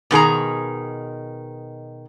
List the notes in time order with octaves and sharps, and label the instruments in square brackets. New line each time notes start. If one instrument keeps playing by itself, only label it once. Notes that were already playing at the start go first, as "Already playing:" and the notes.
[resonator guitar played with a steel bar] B2 D#3 G#4 A#5